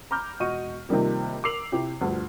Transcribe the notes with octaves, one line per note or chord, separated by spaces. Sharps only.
A#5 B5 D6 F6 G6
E1 F#4 D#5 C#6 D#7
C3 D#3 F3 G3 A#3
A#4 D6 E6 C7 F7 F#7
C3 E4 G4
D2 G2 F3